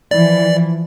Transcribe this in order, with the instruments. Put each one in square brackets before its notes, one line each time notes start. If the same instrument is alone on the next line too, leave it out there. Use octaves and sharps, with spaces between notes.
[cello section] E3 F3 [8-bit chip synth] D5